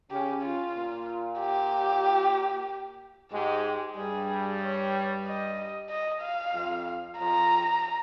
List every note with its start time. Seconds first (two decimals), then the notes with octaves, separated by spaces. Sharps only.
0.10 C#3 C#4 G4
0.42 F4
0.75 A#2 A#3
1.39 G4
3.32 G#2 G#3 G4
3.96 G2 G3 G#4
4.61 C#5
5.26 D#5
5.89 D#5
6.22 F5
6.53 F2 F3
7.18 F2 F3 A#5